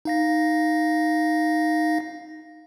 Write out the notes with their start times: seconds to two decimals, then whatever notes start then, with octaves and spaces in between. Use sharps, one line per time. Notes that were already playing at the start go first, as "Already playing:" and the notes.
0.05 D#4 F5 A#6